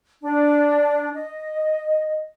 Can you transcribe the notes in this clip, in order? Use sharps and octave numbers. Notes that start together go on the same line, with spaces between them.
D4
D#5